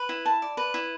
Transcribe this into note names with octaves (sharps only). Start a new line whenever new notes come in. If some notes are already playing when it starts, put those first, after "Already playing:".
Already playing: B4
E4
A5
D5
B4
E4